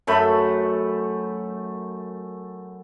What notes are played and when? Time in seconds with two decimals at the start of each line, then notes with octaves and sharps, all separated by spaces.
0.07 F#2 A3 A4 B5